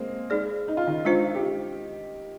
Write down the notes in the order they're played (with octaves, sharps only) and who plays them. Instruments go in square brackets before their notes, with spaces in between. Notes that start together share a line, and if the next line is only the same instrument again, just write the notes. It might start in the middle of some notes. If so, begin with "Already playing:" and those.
Already playing: [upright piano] G#3 A#3 C4 G#4
[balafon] G#3 D#4 G#4 D5
[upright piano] D#4
F4
D#3 D#4
[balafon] G#3 D4 F4 C5
[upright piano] G4